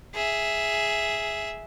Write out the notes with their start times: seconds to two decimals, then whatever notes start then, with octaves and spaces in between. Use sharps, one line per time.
0.15 G#4 E5